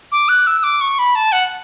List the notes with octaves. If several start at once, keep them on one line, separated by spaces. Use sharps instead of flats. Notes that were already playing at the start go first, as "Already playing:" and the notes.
D6
F#6
E6
D6
C#6
B5
A5
F#5